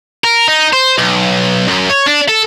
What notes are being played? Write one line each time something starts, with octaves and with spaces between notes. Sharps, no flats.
A#4
D#4
C5
B1
F#2
C#5
D4
A4